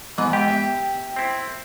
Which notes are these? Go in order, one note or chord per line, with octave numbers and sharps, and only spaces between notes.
G#2 E3 G#3 B3
G4 G5
E5
C4 E4